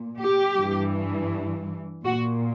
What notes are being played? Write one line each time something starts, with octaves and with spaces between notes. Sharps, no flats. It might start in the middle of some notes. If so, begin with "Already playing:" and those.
Already playing: A#2
G4
G2 E3
A#2 F#4